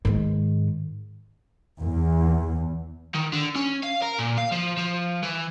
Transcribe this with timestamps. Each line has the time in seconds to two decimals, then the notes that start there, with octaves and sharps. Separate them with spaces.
0.05 G#2 D#3
1.82 E2
3.14 D#3
3.33 D3
3.56 C#4
3.83 F5
4.03 A#4
4.18 A#2
4.37 F5
4.51 F3
4.77 F3
5.23 E3